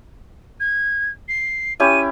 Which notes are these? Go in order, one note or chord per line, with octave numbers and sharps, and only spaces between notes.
G#6
C7
C#4 E4 G4 D#7